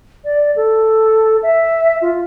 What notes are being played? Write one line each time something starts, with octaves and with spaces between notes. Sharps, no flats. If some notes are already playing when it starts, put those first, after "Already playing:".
D5
A4
E5
F4